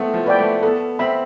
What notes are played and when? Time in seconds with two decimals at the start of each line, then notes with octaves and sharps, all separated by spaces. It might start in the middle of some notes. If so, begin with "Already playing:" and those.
Already playing: A3 B3 C4 E4
0.14 F3
0.26 B4 D5 G5
0.39 A3
0.63 B3 A4
0.99 C4 E5 B5